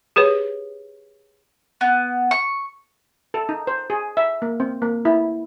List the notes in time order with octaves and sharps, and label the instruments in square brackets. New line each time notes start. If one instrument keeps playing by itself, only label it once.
[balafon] G4 G#4 B4 C#5
[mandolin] B3
C#6
[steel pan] A4
D#4
C5
G#4
E5
A#3
C4
A#3
E4